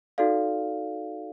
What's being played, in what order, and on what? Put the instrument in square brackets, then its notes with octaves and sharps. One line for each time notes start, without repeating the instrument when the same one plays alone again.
[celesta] D#4 F#4 A4 D5 F5